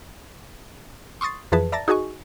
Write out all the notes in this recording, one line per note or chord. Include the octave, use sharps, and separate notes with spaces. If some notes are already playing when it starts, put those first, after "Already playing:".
C6 C#6 D#6 A6 C7
F2 E3 F3 G#4 B4 A5
D5 E5 A5 A#5 A6 A#6
D#4 F#4 G#4 D#5 G#5 C#6